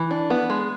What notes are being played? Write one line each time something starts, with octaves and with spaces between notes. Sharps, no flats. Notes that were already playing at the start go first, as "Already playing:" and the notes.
Already playing: E3
D4
B3
G#3